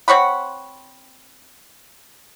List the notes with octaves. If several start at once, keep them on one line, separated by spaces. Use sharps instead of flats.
C4 C#5 F#5 B5